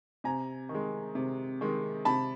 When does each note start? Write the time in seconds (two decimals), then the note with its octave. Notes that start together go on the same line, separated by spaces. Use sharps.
0.24 C3 G#5 A#5
0.69 D#3
0.75 G#3
1.15 C3
1.61 D#3 G#3
2.05 C3 A5 B5